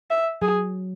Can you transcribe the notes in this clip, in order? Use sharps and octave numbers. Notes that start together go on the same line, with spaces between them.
E5
F#3 G#4